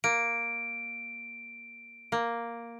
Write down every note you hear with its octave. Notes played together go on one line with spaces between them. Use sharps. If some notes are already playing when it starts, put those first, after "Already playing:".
A#3 D7
A#3